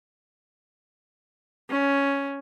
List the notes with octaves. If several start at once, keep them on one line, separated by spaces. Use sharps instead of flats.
C#4